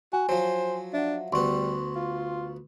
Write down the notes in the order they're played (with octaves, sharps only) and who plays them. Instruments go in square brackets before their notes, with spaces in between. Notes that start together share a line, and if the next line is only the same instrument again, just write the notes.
[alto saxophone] F#4 [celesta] G#5
[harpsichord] F3 F#3 [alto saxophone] C5
[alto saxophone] D4 [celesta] E5 F#5
[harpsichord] D2 B3 [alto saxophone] G3 [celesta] C6 C#6
[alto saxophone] F4